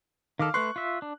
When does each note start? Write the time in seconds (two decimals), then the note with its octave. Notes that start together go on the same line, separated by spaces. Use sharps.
0.39 D#3 A4 F5 D6 F6
0.54 A3 B4 C6 C#6 F#6
0.76 F4 E5
1.02 D4